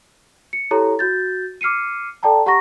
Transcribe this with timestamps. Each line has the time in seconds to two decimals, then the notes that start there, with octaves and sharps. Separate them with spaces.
0.53 C#7
0.71 E4 G4 A4 C#5 A#5
0.99 F#4 G6 A6
1.61 D6 F6 C7 C#7 D#7
2.23 A4 D5 G5 A5 A#5
2.46 G4 F#5 A#5 C#6 A#6